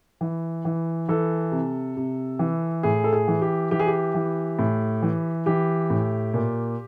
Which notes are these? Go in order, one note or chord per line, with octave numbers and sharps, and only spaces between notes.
E3
E3
E3 A4
C3
C3
E3
A2 G#4
A4
G#4
E3
G4
E3 G4
G#4
G4
E3
A2
E3
E3 G4
A2
A#2